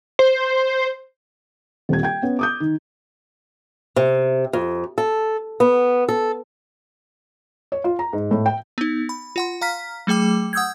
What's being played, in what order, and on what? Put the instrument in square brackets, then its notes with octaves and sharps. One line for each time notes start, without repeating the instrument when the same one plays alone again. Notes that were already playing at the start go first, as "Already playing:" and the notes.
[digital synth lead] C5
[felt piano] D#1 C4 G#6
G5 G#6
B3 C#4
D6 D#6 G6
D#3
[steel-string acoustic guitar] C3
F2
A4
B3
A4
[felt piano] C#5
F4
A#5
G#2
A2
G5
[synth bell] B3 D#4
B5
F4 F#5 C6
F5 A#5 F6 B6
F#3 A3 G#4 G5 D6
F#5 D#6 E6 G6 G#6